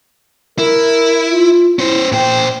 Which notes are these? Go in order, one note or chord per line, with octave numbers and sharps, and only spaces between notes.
E4 A#4
F4
C#4 E4 C5
A#2 C5 G5